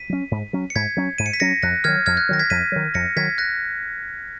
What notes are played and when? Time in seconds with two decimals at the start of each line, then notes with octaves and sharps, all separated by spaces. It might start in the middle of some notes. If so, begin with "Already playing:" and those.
Already playing: B6 D#7
0.09 F#3 C#4
0.31 G#2
0.53 F#3 C#4
0.70 C#7
0.75 G#2 G#6 B6
0.97 F#3 C#4
1.18 G#2 D#7
1.26 C#7
1.33 B6
1.40 F#3 C#4 A#6 C#7
1.63 F2 F#6 A#6
1.84 D#3 F#3 F6 G#6
2.06 F2 F6 G#6
2.17 F#6
2.29 D#3 F#3 A#6
2.39 G#6 B6
2.50 F2 B6 D#7
2.72 D#3 F#3
2.94 F2 A#6 C#7
3.16 D#3 F#3 G#6 B6
3.38 F#6 A#6